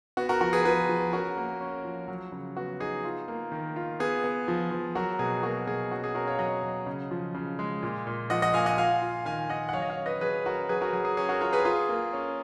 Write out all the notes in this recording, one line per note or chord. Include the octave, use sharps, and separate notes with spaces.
B3 F#4
F#4 A#4
F3 F#4 A#4
G#4 B4
F3 G#4 B4
F3
C#4 F#4 A#4
A#3
C#4
F3
F#3
C#3
B3 F#4
D#4 G#4
F4
A#3
D#3
F4
B3 G#4
B3
F3
F3
F#3 F#4 A#4
B2 G#4
A#3 F#4 A#4
B2 G#4
C#4 F#4
G#4
C#4 F#4 A#4
C#5 F5
F#3 D#5 F#5
F#3
C#3
F3
C#3
G#3
A#2
A#2
F3 D#5 F#5
D#5 F#5
A#2 F5 G#5
D#5 F#5
F4 F5 G#5
F4
D#3 F5 G#5
D#3 D#5 F#5
F#5
F#3 C#5 F5
D#5
C#5 F5
C#4
B4 D#5
F#3 G#4 B4
C#4 F#4 A#4
F#3 G#4 B4
F#4 A#4
F#3 G#4
G#4
C#4 G#4
F#4 A#4
F4 A#4 C#5
G#4 B4
F4 G#4
A#3
C#4